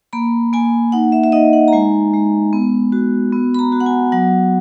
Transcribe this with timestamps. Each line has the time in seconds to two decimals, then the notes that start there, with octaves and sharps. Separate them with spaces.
0.13 A#3 B5
0.53 A#3 G#5
0.92 D#4 F#5
1.12 E5
1.23 E5
1.32 D#4 D#5
1.53 F#5
1.68 A#5
1.73 G#3 G#5
2.13 G#3
2.53 B3
2.92 F#4
3.33 B3
3.54 B5
3.59 A#5
3.72 F#4
3.80 F#5
3.86 G#5
4.12 F#3 F#5